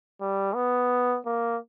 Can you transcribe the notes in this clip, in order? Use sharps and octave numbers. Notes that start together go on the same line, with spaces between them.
G3
B3
A#3